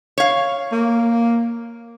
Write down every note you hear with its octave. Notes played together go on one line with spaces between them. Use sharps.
C#5 F5
A#3